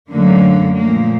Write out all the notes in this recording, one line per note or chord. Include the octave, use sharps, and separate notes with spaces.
F#2 D3 F#3 A3 A#3
A#2 F3 A3 A#3